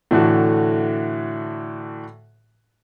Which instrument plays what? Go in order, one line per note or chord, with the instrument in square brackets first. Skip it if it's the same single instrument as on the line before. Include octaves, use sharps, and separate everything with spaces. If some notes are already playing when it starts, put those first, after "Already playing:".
[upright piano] A2 D3 E3 F#4